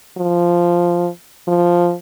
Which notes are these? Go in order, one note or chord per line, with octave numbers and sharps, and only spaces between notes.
F3
F3